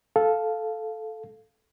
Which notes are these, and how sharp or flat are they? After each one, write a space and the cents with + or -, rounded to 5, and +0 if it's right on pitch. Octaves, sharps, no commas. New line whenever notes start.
A4 -10 F5 +0